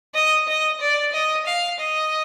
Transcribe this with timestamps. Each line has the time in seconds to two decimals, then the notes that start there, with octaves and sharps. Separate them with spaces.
0.14 D#5
0.48 D#5
0.81 D5
1.13 D#5
1.46 F5
1.79 D#5